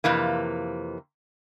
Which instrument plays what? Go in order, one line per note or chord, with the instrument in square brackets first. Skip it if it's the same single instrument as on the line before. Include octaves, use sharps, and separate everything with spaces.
[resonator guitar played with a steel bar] F2 C3 E3 A#3